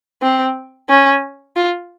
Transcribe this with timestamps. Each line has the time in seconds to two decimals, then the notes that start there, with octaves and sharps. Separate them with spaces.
0.22 C4
0.89 C#4
1.56 F4